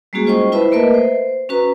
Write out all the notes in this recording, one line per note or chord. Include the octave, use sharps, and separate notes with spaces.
G3 G#3 A#3 C#4 F#4 G#4
F4 C5 D#5 G5 C#6
E4 B4 C5 E5 A5 B5
A3 A#3 A#4 B4 D#5 E5
C5
C#4 F#4 B4 A#5